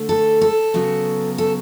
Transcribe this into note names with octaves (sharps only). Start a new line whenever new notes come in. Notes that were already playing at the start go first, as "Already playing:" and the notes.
Already playing: D3 A3
A4
A4
C#3 F#3 B3
A4